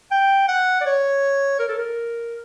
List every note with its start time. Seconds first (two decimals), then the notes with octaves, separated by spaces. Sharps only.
0.11 G5
0.48 F#5
0.81 D5
0.86 C#5
1.59 A#4
1.69 A4
1.79 A#4